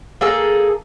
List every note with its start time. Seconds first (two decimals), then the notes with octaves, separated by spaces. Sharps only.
0.21 A#3 G#4 A4